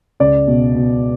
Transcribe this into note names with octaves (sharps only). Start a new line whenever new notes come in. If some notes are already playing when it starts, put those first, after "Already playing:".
C#2 D5
B2
B2